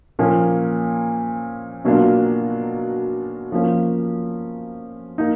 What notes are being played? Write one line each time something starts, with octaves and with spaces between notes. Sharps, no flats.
A#2 F3 A#3 C#4
B2 F#3 A#3 D4 F4
F3 A#3 C#4
A#3 D#4